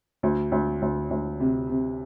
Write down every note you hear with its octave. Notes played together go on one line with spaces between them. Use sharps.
D2
D2
D2
D2
C3
C3